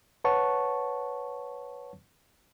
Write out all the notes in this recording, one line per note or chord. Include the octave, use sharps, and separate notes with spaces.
B4 C#5 F#5 A5 C#6